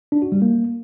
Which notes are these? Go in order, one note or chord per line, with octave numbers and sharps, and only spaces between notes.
D4
F#4
G3
A#3